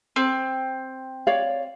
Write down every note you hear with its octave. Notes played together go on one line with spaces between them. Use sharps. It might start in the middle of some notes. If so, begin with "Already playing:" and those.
C4
C#5 D5 F5